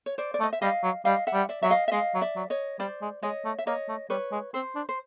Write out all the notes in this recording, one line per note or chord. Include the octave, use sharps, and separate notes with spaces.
C#5
C5 D5
D5
A3
D#5
E5
G3 D#5 F5
F#3
G3 D#5 F5
E5 F#5
G3
D5 E5
F#3 E5
D#5 F5
E5
G#3 D#5 F5
F#3
D5 E5
F#3
C#5 D#5
G3 C5 D5
G#3
G#3 C#5 D#5
A3
E5
A#3 C#5 D#5
A3
G3 B4 C#5
G#3
C4 C5
D4
C5